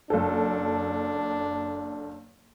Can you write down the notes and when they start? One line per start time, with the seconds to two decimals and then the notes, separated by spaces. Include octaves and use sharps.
0.10 F#1 D4 A4